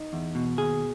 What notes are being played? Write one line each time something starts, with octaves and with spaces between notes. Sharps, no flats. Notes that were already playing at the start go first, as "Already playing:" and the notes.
Already playing: D#4
E2
B2
D#2 G#4